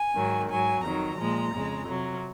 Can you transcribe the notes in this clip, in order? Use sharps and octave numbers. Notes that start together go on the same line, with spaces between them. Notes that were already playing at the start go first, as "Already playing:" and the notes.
Already playing: G#5
G#2 D#3 F#3
G#2 F#3 G#5
F2 D#3 F#3 A#5
A#2 F3 G#3
F2 C#3 G#3
C3 F#3